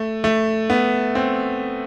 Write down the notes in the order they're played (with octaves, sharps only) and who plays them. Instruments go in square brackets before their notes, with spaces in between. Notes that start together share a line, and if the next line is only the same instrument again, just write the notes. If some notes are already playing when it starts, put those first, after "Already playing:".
Already playing: [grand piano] A3
A3
B3
C4